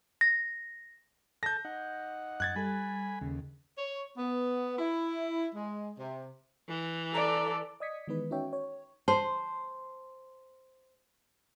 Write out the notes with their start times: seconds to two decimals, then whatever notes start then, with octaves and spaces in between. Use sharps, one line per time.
0.21 A#6
1.43 A4 A5 G6 A#6
1.65 D#4 F#5
2.40 F#2 F#6 G#6 A6
2.56 G3 A4 G#5 B5
3.21 D#2 C#3
3.78 C#5
4.17 B3
4.79 E4
5.54 G#3
5.99 C3
6.68 E3
7.14 A4 D5 A#5
7.80 D5 D#5 D#6 G#6 B6 C#7
8.08 D#3 E3 G#3 B3 D#4 B4
8.31 C#4 D#4 F#4 C#5 E5 G5
8.53 C#5
9.08 C5 A5 C6